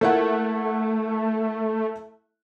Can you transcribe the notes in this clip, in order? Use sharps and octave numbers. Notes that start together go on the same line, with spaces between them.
A3 A#3 E4 F#5